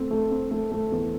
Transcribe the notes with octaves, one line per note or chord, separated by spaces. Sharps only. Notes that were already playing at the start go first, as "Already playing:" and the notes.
Already playing: A3 C4
A3
C4
A3
A3
E2